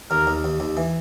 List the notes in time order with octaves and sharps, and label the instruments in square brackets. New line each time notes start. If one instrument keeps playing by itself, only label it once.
[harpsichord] D#2 [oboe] A#4
[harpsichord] D#2
D#2
D#2
E3